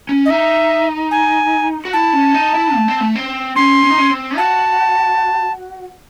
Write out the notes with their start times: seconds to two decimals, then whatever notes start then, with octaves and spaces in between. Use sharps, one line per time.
0.09 C#4
0.26 D#5
0.29 D#4 E5
1.11 G#5
1.85 F#4
1.93 E4 A5
2.13 C#4
2.34 D#4
2.55 E4
2.75 A3
2.88 C4
3.00 A3
3.16 C4
3.56 C#4 C6
3.83 C#4
3.90 D#4
3.98 C#4
4.10 C4
4.37 F#4 A5